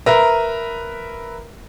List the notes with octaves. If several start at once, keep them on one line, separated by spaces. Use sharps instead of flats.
A#4 B4 E5 A#5